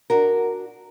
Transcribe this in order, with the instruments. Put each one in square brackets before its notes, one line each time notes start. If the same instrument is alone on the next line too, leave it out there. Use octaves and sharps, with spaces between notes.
[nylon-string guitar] D4 F#4 A#4